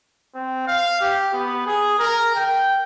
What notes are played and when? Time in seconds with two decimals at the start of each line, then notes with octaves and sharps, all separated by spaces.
0.35 C4
0.67 F5
1.01 G4
1.33 B3
1.66 G#4
1.99 A#4
2.35 G5